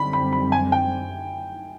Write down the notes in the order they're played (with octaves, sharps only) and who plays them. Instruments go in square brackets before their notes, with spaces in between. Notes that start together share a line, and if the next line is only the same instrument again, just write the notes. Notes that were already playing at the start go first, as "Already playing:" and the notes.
Already playing: [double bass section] F#2 D3 G3 C4 [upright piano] B5
[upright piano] B5
B5
G#5
G5